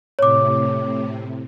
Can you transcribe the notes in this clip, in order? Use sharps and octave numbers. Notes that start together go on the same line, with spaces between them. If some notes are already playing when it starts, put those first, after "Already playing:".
A2 C3 C#5 D6